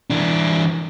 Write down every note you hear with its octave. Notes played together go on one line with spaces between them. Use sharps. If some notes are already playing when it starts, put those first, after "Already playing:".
E3 D4